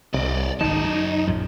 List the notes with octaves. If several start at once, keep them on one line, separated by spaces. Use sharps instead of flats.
C2 D5 D#5
G#1 F#2 D3 D#3 D#4 A5
F#3
A#1 F#2 F3